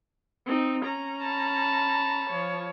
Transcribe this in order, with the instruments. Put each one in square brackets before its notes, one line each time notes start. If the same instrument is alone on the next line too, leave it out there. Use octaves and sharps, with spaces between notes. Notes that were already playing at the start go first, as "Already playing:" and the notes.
[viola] C4 D#4
C#4 A#5
[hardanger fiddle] A5 B5
[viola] F3 C#5